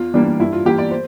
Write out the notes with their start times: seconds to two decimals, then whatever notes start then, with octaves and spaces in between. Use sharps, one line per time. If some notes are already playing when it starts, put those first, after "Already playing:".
Already playing: E2 F4
0.14 E3 G3 A#3 D4
0.40 G2 E4
0.52 F4
0.66 E3 A#3 G4
0.78 D5
0.91 C5